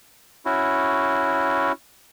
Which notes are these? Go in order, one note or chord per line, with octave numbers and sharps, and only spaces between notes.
C#4 E4 F#4